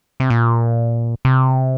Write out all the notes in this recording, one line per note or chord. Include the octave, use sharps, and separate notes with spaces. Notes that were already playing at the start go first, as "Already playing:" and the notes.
C3
A#2
C3